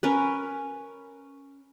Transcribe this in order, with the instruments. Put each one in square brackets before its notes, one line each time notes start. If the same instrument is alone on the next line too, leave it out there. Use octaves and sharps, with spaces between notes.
[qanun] C#4 A#4 B4